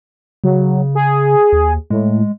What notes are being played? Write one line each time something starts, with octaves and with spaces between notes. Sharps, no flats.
C#3 F#3
G#4
D#2
A2 G#3